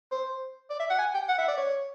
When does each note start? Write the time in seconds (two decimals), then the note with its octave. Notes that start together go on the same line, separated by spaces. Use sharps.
0.12 C5
0.70 D5
0.80 E5
0.90 F#5
0.99 G#5
1.14 G5
1.29 F#5
1.38 E5
1.48 D5
1.57 C#5